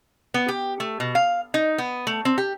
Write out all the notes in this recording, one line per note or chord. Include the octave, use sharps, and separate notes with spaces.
B3
G4
A3
B2
F5
D#4
B3
A3
C4
G4